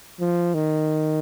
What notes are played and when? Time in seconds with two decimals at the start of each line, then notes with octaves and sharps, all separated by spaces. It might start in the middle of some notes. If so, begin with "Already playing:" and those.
0.21 F3
0.55 D#3